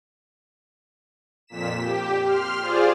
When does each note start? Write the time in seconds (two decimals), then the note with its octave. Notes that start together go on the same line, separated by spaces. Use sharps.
1.47 F2 A#2 B6 E7
1.79 G4
2.22 C6 F6
2.60 F4 G#4 C5 D5